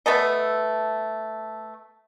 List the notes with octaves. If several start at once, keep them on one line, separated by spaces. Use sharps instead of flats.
A3 B3 A4 D#5